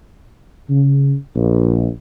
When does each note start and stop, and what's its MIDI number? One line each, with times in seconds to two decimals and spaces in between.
0.70 1.13 49
1.36 1.88 34